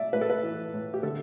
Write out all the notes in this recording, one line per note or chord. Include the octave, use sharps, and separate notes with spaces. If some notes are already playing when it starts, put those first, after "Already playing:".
Already playing: A3 D5 E5
A2 B4
A4
B4
E3
A2
G4
D3 A4